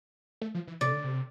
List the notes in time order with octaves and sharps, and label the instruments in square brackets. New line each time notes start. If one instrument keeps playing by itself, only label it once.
[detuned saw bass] A3
F3
E3
[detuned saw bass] C3 [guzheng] D5
[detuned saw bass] D3
C3